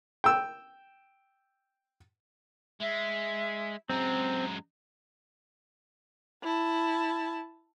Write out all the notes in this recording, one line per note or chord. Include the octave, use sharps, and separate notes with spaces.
G5 E6
G#3 E5
F#2 G#3 C4 A#5
E4 A5